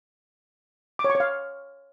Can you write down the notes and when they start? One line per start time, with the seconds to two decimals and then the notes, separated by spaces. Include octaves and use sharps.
0.99 D6
1.04 C#5
1.10 C#6
1.15 C#5
1.20 F5